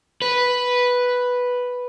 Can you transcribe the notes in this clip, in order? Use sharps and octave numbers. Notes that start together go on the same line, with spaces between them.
B4